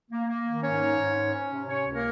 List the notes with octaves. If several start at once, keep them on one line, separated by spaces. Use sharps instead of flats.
A#3
A#3
D#3
G#2 C#4 C#5
D#4
G#2
C#4
C#4
C3
C3 C#4 C#5
C#2
A#3 A#4